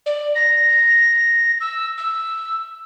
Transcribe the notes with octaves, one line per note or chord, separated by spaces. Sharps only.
D5
A#6
E6
E6